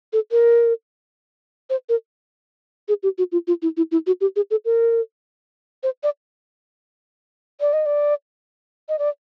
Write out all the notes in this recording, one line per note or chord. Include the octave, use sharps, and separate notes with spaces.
A4
A#4
C5
A#4
G#4
G4
F#4
F4
F4
E4
E4
E4
F#4
G4
G#4
A4
A#4
C5
D5
D5
D#5
D5
D#5
D5